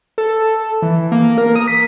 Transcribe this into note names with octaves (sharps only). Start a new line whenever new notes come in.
A4
E3
A#3
A#4
D#6
B6